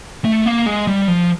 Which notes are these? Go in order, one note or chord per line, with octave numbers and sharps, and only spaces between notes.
A3
A#3
G#3
G3
F3